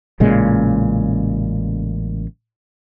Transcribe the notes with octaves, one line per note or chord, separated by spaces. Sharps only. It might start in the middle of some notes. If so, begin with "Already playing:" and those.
A1 A#2 C#3 G#3